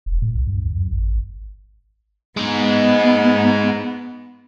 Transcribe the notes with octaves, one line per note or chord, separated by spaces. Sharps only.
E1
A2
C2
G2
D2
F#2
G#1
G#3 B3 D#4